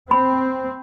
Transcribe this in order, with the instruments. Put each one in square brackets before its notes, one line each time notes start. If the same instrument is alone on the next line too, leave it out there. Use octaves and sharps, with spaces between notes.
[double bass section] C4 [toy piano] B5